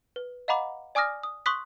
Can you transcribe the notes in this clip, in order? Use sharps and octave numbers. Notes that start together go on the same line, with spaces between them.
B4
D#5 F5 F#5 A#5 B5 D6
D5 G#5 D6 D#6 F6 A#6
D#6
C6 C#6 D#6 F#6 B6